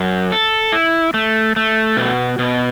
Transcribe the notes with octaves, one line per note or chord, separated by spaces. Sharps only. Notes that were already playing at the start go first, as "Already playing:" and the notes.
Already playing: F#2
A4
E4
A3
A3
B2
B2